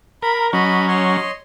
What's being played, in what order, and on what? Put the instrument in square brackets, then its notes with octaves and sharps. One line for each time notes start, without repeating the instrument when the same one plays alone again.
[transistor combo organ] A#4 [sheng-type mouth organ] B5
[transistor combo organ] F#3 C#4 [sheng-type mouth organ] D#5 B5
[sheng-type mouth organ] C#5 D#5 C6